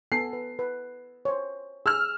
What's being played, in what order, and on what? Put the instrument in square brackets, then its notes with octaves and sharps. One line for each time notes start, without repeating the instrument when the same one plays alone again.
[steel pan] B3 A4 G#5 [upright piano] C7
[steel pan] B4
B4
C5 C#5
[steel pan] G#4 [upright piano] E6 F6